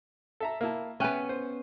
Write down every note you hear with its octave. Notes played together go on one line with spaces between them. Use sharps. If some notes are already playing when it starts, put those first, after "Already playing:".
A4 E5 A#5
A#3 E4 A5
B3 C#4 E5 G5 F#6
C5